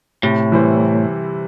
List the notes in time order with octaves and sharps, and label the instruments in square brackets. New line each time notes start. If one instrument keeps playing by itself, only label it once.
[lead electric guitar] A2 [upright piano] C3
[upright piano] E3 G3 E4 C5